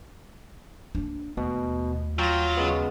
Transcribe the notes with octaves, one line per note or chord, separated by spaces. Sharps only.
A#3 D4
D#2 B2 A3
F#3 F4 G5 A#6
C#3 G#3 B3